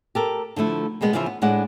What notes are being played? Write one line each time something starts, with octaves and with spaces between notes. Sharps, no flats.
G4 A4 A#4
D3 F3 A3 E4
B2 G3 G#3 B3
C#3 E3 F3 F4 C5 E5
B3
A2 G#3 D4 F#5